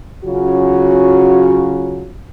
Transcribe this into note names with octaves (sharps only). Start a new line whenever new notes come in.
C#3 F#3 C#4 F4 F#4